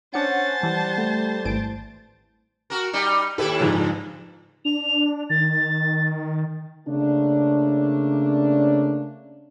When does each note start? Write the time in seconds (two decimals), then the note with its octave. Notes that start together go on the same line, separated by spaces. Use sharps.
0.14 C#4 D4 C5 F#5 A5 C#7
0.63 E3 G3
0.98 A3
1.45 G#1 E3 D7
2.70 F#4 A#4
2.93 G3 D#4
3.38 D#2 E4 G4 A4 B4
3.60 F#1 G#2 F3
3.72 G2
4.65 D4 F7
5.30 D#3 A6
6.88 C#3 A3 A#3 C#4 D4